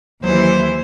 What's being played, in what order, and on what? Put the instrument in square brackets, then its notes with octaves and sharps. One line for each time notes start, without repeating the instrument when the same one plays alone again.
[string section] D#2 E3 [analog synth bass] F#3 [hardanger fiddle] C5